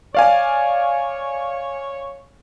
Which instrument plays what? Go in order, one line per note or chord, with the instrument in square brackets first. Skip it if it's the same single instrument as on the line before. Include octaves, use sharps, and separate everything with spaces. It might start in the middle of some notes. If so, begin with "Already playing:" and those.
[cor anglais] C#5 [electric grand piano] D5 F5 G#5